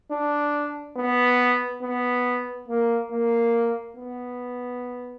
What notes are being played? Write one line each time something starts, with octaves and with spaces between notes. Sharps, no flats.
D4
B3
B3
A#3
A#3
B3